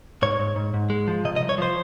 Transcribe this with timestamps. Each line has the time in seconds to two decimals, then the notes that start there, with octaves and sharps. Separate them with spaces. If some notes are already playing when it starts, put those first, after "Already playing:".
0.22 G#2 C#5
0.39 G#2
0.56 G#2
0.74 G#2
0.90 G#3
1.08 F3
1.25 C3 D#5
1.36 D#5
1.41 C2
1.49 C#5
1.58 F3 C5